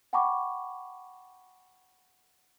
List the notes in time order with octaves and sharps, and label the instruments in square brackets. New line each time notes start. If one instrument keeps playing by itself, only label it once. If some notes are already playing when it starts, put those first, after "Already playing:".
[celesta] F#5 G5 A5 B5 C#6 D6